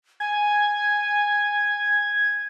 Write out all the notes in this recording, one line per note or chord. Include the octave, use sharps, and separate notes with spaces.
G#5 G#6